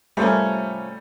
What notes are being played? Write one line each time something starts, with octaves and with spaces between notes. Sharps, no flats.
C3 F3 G3 A3 A#3 C#4